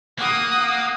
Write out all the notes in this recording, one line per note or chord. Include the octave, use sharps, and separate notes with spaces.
A#3 F#5 D#6